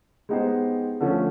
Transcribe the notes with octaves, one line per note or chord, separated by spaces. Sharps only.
G#3 B3 D#4 G4 C5
D3 F3 A3 C#4